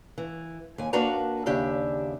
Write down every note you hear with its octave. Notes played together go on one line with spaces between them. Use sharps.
E3
D#2 G#5
A#3 D4 F#4 B4 A5 A#5
D#2 C#3 D4 G4 E5